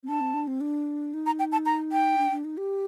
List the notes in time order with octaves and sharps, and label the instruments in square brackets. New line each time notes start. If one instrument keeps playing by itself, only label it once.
[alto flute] C4
[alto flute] D4 [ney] A5
[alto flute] C4
D4
C4
D4
D#4
[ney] A#5
G5
A5
A#5
G5
[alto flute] D4
D4
D#4
G4